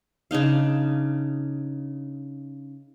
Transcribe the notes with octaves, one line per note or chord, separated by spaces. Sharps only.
C#3 D4 D#4 F5